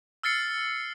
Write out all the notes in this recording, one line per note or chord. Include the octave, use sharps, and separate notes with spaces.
E6 F6 A6 C7 C#7